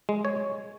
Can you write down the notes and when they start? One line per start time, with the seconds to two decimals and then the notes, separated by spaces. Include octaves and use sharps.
0.09 G#3
0.25 C#5